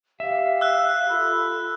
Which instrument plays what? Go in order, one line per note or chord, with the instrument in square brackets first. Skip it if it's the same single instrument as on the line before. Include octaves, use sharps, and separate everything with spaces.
[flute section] G4 F5 [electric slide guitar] E5
[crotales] E6 F#6
[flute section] F4 A4 B5